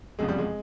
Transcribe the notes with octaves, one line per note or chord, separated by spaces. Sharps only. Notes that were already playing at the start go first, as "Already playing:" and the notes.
F1 E2 C#3 F3 G#3
G3
G#3